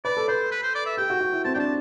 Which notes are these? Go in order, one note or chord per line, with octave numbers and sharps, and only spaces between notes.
B4 D5
A4
B4 C5
B4
C5
D5
E5
G4 G5
F#4
F#4
E4
C4 A5
D4 G5
A5